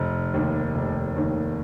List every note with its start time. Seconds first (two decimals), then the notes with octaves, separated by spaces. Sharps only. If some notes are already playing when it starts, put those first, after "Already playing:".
Already playing: F1
0.34 D#2 D#3
0.75 F1
1.16 D#2 D#3